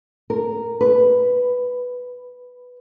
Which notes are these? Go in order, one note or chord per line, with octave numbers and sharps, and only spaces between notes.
A#4
B4